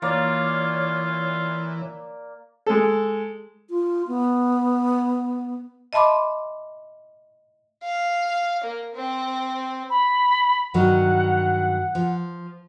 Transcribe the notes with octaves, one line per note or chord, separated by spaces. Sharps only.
E3 A#3 F4 C#5 D5
G#3 A4
F4
B3
D#5 E5 A5 B5 C6 D6
F5
A#3
C4
B5
G2 D#3 F#3 F#5
F3